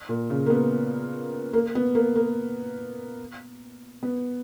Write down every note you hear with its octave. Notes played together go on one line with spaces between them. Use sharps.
A#2
C#3
A#3
B3
A#3
B3
A#3
A#3
B3